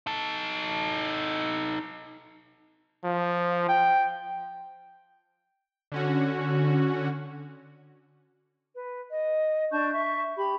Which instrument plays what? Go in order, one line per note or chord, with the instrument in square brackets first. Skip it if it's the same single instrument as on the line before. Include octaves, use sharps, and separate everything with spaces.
[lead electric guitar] D#4 A4
[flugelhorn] F3
G5
[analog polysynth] D3 C#4 F#4
[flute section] B4
D#5
D4 A5 C#6 G6
E5 C#6
G4 B5